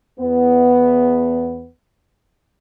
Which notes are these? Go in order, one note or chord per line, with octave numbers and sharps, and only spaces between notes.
E2 B3